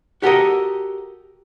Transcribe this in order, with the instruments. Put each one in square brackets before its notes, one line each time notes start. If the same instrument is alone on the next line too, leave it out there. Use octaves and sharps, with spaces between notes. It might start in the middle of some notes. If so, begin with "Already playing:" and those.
[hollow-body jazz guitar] F#4 G4 A4 A#4 D#5